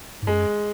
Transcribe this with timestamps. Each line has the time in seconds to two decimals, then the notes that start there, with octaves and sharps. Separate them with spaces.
0.22 G#2
0.27 F#2 G#3